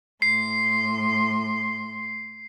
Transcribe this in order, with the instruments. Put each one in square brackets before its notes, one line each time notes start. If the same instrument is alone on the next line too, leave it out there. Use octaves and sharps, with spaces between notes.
[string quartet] A2 C6 [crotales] C7